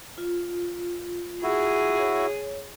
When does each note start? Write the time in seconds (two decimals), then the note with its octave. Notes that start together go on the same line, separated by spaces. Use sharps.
0.18 F4
1.43 E4 F#4 G#4
1.99 C#5